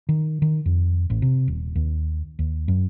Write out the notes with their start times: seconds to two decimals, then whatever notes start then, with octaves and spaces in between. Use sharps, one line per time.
0.09 D#3
0.42 D#3
0.66 F2
1.10 A1
1.22 C3
1.48 D#1
1.75 D#2
2.39 D#2
2.68 F#2